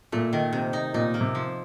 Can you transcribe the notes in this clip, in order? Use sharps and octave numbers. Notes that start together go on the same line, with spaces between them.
A#2 A3
D#3
C3
D#4
A#2 D#4
A#3
C3
F3